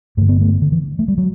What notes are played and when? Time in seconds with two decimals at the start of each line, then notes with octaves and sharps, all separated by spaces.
0.17 G2 D3 A3
0.29 B3
0.41 A3
0.62 D3
0.72 E3
0.99 A3
1.08 G3
1.18 F#3